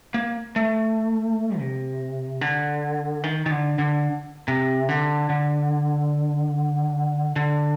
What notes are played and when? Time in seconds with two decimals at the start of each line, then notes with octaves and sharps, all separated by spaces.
0.14 A#3
0.56 A3
1.59 C3
2.41 D3
3.24 D#3
3.46 D#3
3.51 D3
3.79 D3
4.48 C3
4.89 D3
5.30 D3
7.36 D3